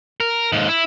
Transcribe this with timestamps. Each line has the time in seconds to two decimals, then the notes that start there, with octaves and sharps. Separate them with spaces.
0.20 A#4
0.52 D#2 G#2
0.69 E4